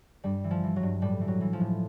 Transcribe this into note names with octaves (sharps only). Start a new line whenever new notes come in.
G2 G3
E3
F3
E3
F#3
G2
A2 G3
E3
F#3
E3
F3
A2